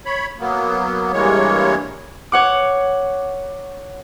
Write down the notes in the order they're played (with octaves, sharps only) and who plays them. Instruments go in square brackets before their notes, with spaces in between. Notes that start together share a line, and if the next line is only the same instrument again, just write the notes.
[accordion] C#5 B5
F#3 A#3 B3
G2 E3 G#3 A#3 C#5
[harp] C#5 F#5 D6